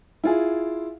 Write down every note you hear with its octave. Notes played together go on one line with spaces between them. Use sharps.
E4 F4 G#4